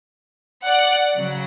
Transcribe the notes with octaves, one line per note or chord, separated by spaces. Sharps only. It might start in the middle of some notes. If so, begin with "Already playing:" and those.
D5 F#5
C#3 F#3